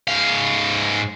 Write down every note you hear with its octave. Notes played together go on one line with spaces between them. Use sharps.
G#2 F5